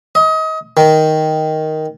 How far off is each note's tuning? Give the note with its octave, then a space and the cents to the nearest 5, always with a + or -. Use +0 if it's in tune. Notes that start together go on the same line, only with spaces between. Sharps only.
D#5 +30
D#3 +5